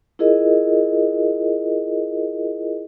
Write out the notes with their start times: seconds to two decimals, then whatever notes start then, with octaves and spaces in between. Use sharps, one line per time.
0.19 E4 F4 G#4 A#4 D#5